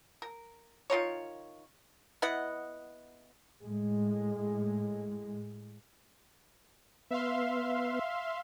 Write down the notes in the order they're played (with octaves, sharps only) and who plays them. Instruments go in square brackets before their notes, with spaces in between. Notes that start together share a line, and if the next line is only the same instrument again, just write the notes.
[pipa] A#4
D#3 F4 A#4 C#5
B3 E4 D#5 F#5
[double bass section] A2 G#3
[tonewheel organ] B3 B4 [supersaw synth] E5 F5 C6